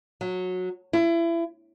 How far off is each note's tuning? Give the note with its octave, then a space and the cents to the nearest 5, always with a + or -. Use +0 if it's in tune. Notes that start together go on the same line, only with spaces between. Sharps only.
F#3 -15
E4 +30